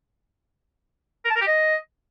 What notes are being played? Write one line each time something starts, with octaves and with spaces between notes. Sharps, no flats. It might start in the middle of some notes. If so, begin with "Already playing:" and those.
A#4
A5
A#4
G4
D#5